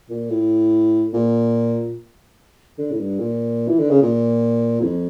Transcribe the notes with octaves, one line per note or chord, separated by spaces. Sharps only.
A#2
A2
A#2
D3
A2
G2
A#2
E3
D3
C#3
A#2
E2
F2